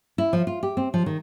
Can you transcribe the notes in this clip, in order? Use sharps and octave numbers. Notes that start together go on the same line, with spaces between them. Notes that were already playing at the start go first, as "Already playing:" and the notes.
E4
F3
F4
G4
C4
F3
D#3